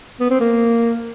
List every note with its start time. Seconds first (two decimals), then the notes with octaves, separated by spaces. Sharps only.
0.20 B3
0.30 C4
0.40 A#3